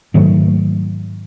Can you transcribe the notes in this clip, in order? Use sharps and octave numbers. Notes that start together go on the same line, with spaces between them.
G#2 D#3 F#3 A3